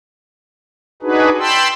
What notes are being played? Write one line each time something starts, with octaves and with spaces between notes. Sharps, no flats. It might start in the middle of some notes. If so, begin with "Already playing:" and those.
D4 D#4 F#4 G#4 B4
G5 A5 B5 C6 E6